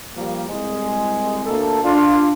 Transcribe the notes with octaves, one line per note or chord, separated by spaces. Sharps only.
F3 G3 A#3
C2 G#3
D2 A#3 A4
D4 F4